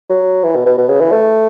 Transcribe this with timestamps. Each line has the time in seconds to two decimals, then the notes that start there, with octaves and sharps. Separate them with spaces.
0.09 F#3
0.44 E3
0.55 B2
0.66 B2
0.78 B2
0.89 C#3
1.01 E3
1.11 A3